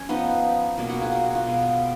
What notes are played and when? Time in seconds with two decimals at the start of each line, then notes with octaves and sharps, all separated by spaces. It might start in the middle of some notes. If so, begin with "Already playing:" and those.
Already playing: C#4 G#5
0.09 F3 B3 D#4 B4 D#5
0.78 B2 F#3 A#3 F4
0.89 F#4
1.01 F4 G#4
1.12 F#4
1.25 F#4
1.35 F4
1.47 B2 G#3 B3